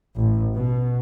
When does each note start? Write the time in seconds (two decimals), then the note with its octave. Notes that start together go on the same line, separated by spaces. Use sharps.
0.18 A1
0.54 B2